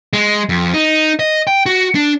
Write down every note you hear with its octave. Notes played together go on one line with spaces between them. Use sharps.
G#3
F2
D#4
D#5
G5
F#4
D4